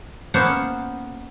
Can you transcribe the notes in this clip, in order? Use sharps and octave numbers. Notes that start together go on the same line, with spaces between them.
A#3 B3 C#4 C5 F#5 A5